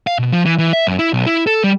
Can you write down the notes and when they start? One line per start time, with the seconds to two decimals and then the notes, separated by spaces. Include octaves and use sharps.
0.07 F5
0.19 B2
0.32 F3
0.45 E3
0.58 E3
0.73 E5
0.87 F#2
0.99 E4
1.13 B1
1.26 E4
1.47 A4
1.64 G3